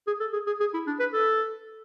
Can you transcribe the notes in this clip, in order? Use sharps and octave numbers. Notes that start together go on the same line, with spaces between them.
G#4
A4
G#4
G#4
G#4
E4
D4
B4
A4